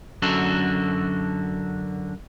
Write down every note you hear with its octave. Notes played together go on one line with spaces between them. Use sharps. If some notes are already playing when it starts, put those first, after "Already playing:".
F#2 D3 F#4 A4